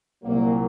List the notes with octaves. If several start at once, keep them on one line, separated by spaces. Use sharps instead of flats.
C2 A#2 F#3 A#3